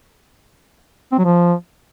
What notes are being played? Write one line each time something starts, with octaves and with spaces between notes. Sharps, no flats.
C4
F#3
F3